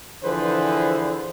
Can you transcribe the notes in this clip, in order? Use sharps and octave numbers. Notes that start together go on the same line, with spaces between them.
D3 E3 F3 G#4 B4 C5